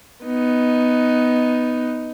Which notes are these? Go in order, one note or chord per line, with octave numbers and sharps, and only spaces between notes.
B3 D#4